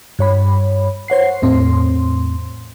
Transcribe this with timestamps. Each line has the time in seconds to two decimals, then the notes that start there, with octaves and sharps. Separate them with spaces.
0.19 G2 C#5 B5
1.08 C5 C#5 F#5 C7
1.42 E2 A2 C4 C6